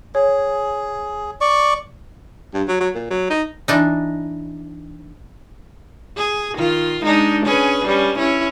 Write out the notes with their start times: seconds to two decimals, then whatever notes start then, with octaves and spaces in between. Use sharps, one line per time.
0.15 G#4 C#5
1.41 D5 C#6
2.54 G2
2.68 F#3
2.80 F#3
2.95 A#2
3.11 F#3
3.30 D#4
3.68 E3 D4 D#4
6.17 G#4
6.54 D#3 F4
7.03 G#3 D4 D#4
7.45 C#4 G#4 B4
7.85 G3 C#4
8.18 C#4 E4